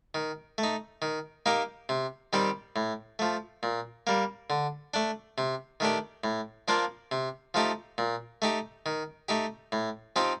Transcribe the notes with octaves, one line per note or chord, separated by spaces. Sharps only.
D#3
A3
D#4
D#3
A#3 D#4 G4
C3
D#3 G3 C4 G4
A2
F3 A3
A#2
G3 A#3
D3
A3 D4
C3
D#3 A3 D4 G4
A2
F3 A#3 D4 F4
C3
F3 A3 D#4 G4
A#2
A3 D#4 G4
D#3
A3 D#4 G4
A2
F3 C4 D#4 G4